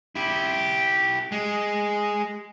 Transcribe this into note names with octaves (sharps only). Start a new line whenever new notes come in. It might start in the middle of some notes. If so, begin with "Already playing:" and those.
E4 G4
G#3